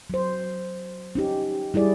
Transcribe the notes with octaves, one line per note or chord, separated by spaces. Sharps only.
F#3 C5
C#4 D#4 G4
G3 E4 G#4 D5